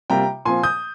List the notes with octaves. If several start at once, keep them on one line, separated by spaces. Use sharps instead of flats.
C3 G3 A#3 F4 G5 A#5
A#2 F3 C4 G#5 C6
D#6 G6